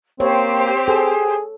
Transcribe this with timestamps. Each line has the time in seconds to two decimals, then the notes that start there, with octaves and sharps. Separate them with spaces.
0.20 A#3 C4 G4 C5 C#5
0.88 G#4 A4